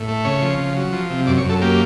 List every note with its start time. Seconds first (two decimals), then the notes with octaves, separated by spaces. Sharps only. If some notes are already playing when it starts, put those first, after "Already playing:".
Already playing: A2
0.08 A3
0.25 C#3 C#5
0.42 F3
0.58 C#3
0.76 F#3
0.92 F3
1.10 C3
1.27 F#2 D5
1.38 C#5
1.44 F#2
1.50 A4
1.61 A#3 G4